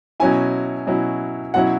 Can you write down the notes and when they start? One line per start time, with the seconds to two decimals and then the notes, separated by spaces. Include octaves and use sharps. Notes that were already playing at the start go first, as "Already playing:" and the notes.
0.20 B2 F#3 C#4 E4 G#5
0.87 B2 F#3 C#4 E4
1.54 B2 F#3 C#4 E4 F#5